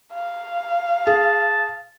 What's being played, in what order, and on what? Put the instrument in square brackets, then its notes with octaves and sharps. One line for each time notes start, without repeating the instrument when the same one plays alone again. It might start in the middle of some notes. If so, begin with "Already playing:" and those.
[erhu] F5
[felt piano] G#4 [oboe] A5